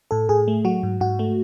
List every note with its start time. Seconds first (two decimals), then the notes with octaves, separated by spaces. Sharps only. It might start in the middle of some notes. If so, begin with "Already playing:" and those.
0.11 A2 A4
0.29 A2 G#4
0.48 A3
0.65 F#3 F#4
0.83 G#2
1.01 G#2 F#4
1.19 A3